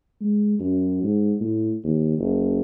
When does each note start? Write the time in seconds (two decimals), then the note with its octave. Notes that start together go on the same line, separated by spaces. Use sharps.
0.21 G#3
0.60 F#2
1.03 G#2
1.41 A2
1.84 D#2
2.19 F#1